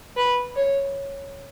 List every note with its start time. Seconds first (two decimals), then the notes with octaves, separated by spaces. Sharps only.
0.17 B4
0.57 C#5